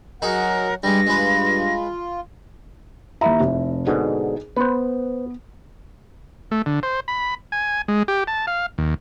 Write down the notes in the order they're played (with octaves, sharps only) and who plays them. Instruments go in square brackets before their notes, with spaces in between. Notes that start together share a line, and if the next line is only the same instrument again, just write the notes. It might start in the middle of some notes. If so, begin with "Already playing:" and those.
[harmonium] F#3 F#5 [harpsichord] D#4 F#4 G#4 [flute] A#4
[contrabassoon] G2 [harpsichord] G3 G#3 [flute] A#6
[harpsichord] G#3 B4 [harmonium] F4
[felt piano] D#2 E5 A#5 [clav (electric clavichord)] E4
[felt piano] F1
[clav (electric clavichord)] G#2 B2 D3 [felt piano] D#4 G#4
[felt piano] B3 [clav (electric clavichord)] B4 C5
[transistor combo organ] A3
D3
C5
B5
G#5
G#3
G4
A5
F5
D#2